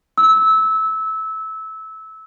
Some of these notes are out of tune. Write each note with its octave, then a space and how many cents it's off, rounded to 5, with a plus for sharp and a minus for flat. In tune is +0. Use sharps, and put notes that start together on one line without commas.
E6 -20